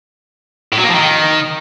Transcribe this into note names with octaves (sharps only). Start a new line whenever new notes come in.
A2
F#3
A#3
F3
D#3